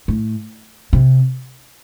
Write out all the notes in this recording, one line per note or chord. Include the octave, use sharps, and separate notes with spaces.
A2
C3